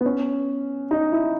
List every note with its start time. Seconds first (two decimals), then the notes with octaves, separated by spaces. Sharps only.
0.01 B3
0.06 C#4
0.91 D#4
1.12 E4